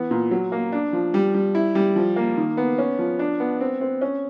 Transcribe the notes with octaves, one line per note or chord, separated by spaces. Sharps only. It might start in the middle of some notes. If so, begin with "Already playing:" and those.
Already playing: E3 B3
A#2
F#3
A#3
D4
F3
G3
G3
E4
G3
F3
A#3
D#3
B3
C#4
F3
D4
B3
C4
C4
C#4